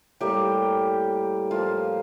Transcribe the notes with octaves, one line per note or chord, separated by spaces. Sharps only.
A2 G3 A#3 G4
A2 F3 A#3 F4